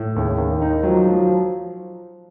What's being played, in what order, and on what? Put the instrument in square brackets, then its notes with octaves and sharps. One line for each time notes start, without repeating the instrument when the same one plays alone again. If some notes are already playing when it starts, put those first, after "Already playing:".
Already playing: [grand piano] A2
[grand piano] D#2 [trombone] C#3
[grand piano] D#2
[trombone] D#3
[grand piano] D#4
[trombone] F3 [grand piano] F#3
[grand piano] F#3